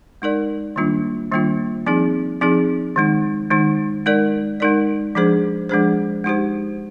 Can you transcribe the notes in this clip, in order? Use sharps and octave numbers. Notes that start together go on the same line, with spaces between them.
G#3 D#4 A#4 D5
D#3 G3 A#3 D4 F4
D#3 G3 A#3 D4 F4
F3 C4 D#4 G#4
F3 C4 D#4 G#4
D#3 G#3 D#4
D#3 G#3 D#4
G#3 D#4 A#4 D5
G#3 D#4 A#4 D5
F3 G#3 D4 G#4 C5
F3 G#3 D4 G#4 C5
G#3 D#4 G4 C5